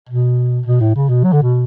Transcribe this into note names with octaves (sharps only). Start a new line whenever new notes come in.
B2
B2
A2
C#3
B2
F#3
D3
B2